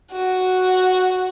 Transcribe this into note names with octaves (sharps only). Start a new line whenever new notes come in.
F#4